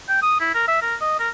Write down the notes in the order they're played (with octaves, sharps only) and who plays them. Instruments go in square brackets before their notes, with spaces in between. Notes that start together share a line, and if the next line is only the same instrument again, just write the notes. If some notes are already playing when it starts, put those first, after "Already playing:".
[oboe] G5
D#6
E4
A#4
E5
A#4
D#5
A#4